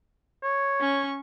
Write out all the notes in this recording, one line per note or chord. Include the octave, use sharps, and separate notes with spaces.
C#5
C#4 C#6